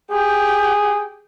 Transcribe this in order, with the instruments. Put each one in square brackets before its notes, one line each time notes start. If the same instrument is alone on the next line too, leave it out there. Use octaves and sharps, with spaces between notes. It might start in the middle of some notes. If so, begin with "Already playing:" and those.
[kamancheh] G4 G5 [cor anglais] G#4